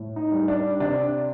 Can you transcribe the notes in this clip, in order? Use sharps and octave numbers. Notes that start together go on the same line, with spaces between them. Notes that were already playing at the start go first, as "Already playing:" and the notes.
Already playing: A2
D#4
G3
D4
C3 D4